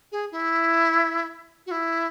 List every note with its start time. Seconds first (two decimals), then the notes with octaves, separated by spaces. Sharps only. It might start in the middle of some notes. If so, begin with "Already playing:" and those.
0.12 G#4
0.32 E4
1.66 F#4
1.71 E4